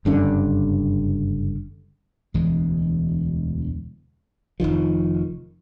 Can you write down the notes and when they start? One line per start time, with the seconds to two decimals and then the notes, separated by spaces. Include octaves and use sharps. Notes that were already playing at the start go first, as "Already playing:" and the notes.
0.05 F#1 G2 D3 C#4
2.34 E1 D2 E3 G#3
4.60 F1 A#1 D#3 F3